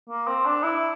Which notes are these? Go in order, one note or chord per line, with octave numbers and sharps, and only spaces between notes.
A#3
C4
D4
E4